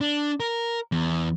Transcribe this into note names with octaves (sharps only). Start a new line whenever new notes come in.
D4
A#4
E2